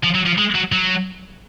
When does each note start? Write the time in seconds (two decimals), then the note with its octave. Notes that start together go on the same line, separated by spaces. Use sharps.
0.03 F3
0.15 F#3
0.26 F3
0.38 G#3
0.55 F#3
0.72 F#3